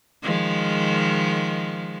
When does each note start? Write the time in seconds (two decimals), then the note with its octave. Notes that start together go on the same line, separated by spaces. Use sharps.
0.22 D#3 F3 G#3